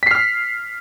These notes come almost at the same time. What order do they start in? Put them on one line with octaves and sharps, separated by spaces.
B6 C7 F6